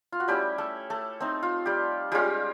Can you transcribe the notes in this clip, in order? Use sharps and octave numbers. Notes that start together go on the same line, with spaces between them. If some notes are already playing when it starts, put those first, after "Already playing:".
F4
F#4
G3 A3 C#4 E4 G4
A3 A4
A3 A4
A3 C4 D#4
F4
G3 G4
G3 G#3 C#4 F4 G4